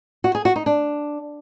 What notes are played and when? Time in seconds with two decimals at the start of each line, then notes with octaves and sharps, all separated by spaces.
0.24 F#4
0.35 G#4
0.45 F#4
0.56 D#4
0.66 D4